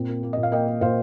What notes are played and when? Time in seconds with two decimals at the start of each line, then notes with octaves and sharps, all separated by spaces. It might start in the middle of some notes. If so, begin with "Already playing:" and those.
Already playing: A#2 C4
0.09 A#3
0.23 A#3
0.33 A#2 D#5
0.43 F5
0.52 A#3 D#5 G5
0.68 A#3
0.81 A#2 C5 F5